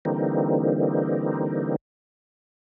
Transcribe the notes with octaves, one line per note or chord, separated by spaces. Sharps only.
D3 E3 G3 A#3 C4 D#4